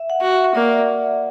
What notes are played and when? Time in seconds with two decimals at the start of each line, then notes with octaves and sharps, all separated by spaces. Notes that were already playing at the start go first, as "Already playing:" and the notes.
Already playing: E5
0.10 F#5
0.21 F#4
0.32 E5
0.55 A#3 D5